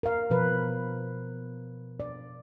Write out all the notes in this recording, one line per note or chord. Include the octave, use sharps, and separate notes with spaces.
A#4 F5
B2 F3 B4
D5